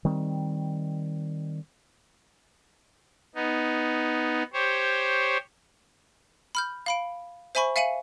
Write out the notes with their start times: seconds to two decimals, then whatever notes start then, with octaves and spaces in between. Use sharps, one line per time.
0.05 D#3 G3 C4
3.35 B3 D#4
4.53 G4 C5 C#5
6.55 B5 F6 G6
6.86 F5 B5 D7
7.55 C5 E5 G#5 B5 C#6
7.76 E5 F5 G#5 C#7 D#7 F#7